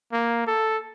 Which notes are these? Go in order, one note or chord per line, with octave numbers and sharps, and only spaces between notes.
A#3
A4